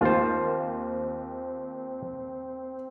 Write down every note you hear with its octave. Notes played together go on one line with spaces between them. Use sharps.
D#2 A#3 C4 F4 C5